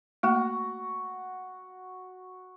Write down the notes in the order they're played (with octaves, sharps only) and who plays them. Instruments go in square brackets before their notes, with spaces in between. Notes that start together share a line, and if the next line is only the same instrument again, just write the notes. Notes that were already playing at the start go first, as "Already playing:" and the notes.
[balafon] A3 A#3 [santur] F#4